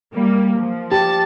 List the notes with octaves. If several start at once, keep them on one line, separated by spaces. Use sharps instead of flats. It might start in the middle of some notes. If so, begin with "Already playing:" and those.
G3 A#3
F3
G4 A5